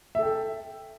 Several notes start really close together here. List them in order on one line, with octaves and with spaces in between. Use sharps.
E5 A4 G5